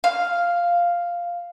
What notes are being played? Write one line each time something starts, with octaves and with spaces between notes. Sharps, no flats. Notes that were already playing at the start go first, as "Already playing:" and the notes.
F5